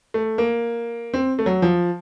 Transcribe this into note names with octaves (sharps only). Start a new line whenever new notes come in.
A3
A#3
C4
A3
F#3
F3